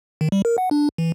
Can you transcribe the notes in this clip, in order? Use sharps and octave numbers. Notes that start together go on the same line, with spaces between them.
D#3
G3
A#4
F#5
D4
E3